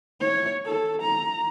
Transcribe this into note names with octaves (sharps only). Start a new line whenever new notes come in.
C#5
A4
A#5